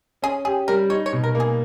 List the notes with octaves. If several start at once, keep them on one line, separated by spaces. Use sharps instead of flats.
C#4 G#4
G4 G#4
G3 A#4
D#4 C#5
C#5
B2
A#4
A#3
G#4